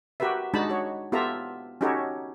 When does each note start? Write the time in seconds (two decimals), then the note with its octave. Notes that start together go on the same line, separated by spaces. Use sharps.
0.20 F#4 G4 A#4 B4 E5
0.54 G#3 D4 D#4 F#4 A5 B5
0.70 F#4 C#5
1.12 B3 F4 G4 A4 E5 A#5
1.81 C#4 D#4 F#4 G4 A4 C#5